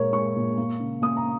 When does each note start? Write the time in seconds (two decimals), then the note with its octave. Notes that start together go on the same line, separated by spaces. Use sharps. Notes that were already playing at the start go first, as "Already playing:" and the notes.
Already playing: A#2 G#3 A#3 A#4 C#5
0.13 G#3 C#6
0.36 A#2
0.58 A#3
0.80 C#3
1.02 A#3 D#6
1.17 A#5